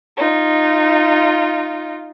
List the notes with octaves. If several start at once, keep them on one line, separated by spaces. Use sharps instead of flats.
D#4 F4